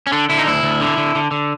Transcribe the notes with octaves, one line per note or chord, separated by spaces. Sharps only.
C#4
D3 D4
D3 E4
D#4
D2 E4
D2
D3
D3
D3
D3